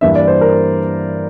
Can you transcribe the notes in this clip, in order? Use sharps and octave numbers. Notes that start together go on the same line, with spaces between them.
G2 E3 A#3 D4 E5
D5
C5
A#4